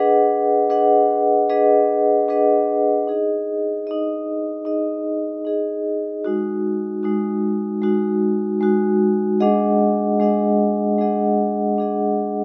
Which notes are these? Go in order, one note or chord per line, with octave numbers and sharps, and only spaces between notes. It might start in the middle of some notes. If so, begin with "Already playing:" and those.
Already playing: D4 G#4 B4 D#5 F#5
D4 G#4 B4 D#5 F#5
D4 G#4 B4 D#5 F#5
D4 G#4 B4 D#5 F#5
D#4 G#4 D#5
D#4 G#4 D#5
D#4 G#4 D#5
D#4 G#4 D#5
G#3 D#4 F#4
G#3 D#4 F#4
G#3 D#4 F#4
G#3 D#4 F#4
G#3 D4 G#4 D#5 F#5
G#3 D4 G#4 D#5 F#5
G#3 D4 G#4 D#5 F#5
G#3 D4 G#4 D#5 F#5